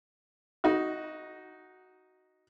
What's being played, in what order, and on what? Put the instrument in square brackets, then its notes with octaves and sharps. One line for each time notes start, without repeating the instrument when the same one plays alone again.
[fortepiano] D#4 F#4